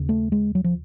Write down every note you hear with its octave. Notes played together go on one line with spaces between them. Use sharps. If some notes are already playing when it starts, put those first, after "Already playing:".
Already playing: D#2 C#3
A3
G#3
F#3
F3